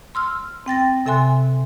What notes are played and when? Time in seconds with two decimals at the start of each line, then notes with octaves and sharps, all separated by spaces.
0.15 C6 E6 F6
0.66 C4 G5 A6 A#6
1.06 C3 A4 E5 G#5 C6 F#6